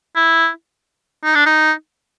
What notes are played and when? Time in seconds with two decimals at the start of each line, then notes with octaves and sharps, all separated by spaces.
0.16 E4
1.24 D#4
1.35 D4
1.46 D#4